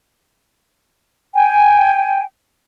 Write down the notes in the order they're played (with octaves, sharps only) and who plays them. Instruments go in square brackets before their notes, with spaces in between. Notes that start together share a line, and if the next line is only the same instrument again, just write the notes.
[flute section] G5 G#5